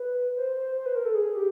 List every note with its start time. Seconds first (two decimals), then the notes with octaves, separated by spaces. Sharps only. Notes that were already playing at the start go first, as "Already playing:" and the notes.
Already playing: B4
0.37 C5
0.57 C5
0.76 C5
0.86 B4
0.95 A#4
1.05 A4
1.14 G#4
1.35 G4